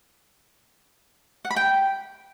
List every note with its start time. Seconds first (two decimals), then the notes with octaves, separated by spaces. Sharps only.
1.45 F#5
1.51 B5
1.56 G5